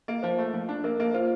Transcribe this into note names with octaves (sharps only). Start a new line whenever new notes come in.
A#3
F3 C5
A3
F3
D4
A#3 A#4
A#3
F4 C5